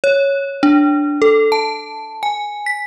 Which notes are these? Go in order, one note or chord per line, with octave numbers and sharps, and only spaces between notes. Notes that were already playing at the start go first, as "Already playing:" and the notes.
C#5
D4
A4
A5
G#5
B6